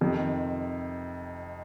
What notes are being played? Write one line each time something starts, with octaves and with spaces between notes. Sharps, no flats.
F2 C3 D#3